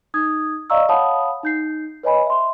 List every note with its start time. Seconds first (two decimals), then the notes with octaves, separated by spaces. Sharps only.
0.14 D#4 D#6 G#6
0.70 D5 D#5 F5 A#5 C#6 E6
0.89 C#5 F5 F#5 A5 B5 D#6
1.43 D#4 G6 C7
2.03 B4 C#5 D#5 G#5 B5
2.26 E5 C6